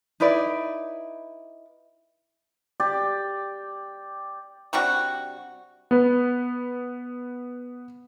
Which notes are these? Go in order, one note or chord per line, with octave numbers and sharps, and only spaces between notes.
D#4 E4 B4 D5
G4 D5
C3 G3 D4 F#4
B3 B4